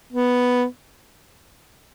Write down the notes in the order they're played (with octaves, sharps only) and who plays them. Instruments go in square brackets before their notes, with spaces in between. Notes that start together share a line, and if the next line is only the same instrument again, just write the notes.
[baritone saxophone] B3